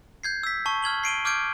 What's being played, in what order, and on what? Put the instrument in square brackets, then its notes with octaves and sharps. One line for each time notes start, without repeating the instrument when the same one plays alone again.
[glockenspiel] G6 G#6 C7
E6 B6
A5 C#6
F6 G#6 F#7 G7
C7 D7 D#7 G7
D6 F6 G6 G#6 D7